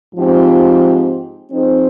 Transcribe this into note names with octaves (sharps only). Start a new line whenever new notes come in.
G#2 F3 C4 G4
F3 C4 D#4 G#4 C5